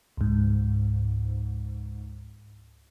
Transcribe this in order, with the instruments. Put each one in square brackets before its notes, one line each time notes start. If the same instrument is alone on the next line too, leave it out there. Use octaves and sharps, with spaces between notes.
[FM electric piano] C#2 G#2